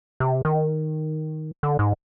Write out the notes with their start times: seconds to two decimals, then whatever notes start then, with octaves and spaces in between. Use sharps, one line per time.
0.20 C3
0.45 D#3
1.63 D3
1.79 G#2